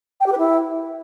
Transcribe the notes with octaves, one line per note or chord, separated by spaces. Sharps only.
G5
G4
B4
E4